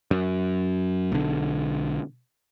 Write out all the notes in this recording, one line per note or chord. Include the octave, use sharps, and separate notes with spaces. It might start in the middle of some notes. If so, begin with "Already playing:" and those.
F#2
B1 D3